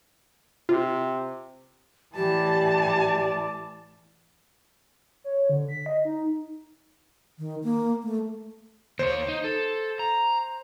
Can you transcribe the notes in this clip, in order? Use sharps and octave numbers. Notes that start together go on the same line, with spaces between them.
C3 F4
A2 E3 G4 D5 A5
C#5
D3
B6
D#5
D#4
D#3
A#3
A3
D#2 C5 C#5
D#4
A4
A#5